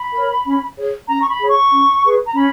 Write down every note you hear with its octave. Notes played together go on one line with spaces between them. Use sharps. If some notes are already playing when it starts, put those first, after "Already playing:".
Already playing: B5
A#4 C#5
C#4
G#4 C#5
C#4 A#5
C#6
B5
G#4 C#5
C#6
C#4
G#4 B4
A#5
C#4 B5